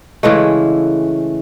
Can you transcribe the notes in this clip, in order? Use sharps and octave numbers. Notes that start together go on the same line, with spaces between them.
C#3 E3 G#3 A3